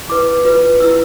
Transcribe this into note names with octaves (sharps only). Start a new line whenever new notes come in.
E4 B4 D6
F4 B4
E4 B4 E6